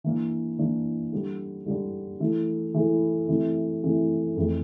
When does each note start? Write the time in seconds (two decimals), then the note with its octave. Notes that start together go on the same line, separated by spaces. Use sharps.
0.04 E3 A#3 D4
0.59 E3 A#3 D4
1.13 D3 G3 D4
1.66 D3 G3 D4
2.20 E3 A3 E4 A4
2.74 E3 A3 E4 A4
3.28 C3 E3 A3 E4
3.83 C3 E3 A3 E4
4.36 F2 E3 A3